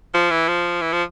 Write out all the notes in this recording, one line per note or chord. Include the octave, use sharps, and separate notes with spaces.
F3
E3
F3
E3
F3